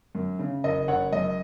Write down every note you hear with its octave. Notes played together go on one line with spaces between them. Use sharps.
F#2
C#3
F#1 D#5
F#1 C#5 F#5
F#2 D#5